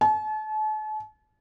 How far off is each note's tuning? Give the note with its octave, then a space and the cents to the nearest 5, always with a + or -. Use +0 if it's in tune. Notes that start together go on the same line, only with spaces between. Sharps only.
A5 -40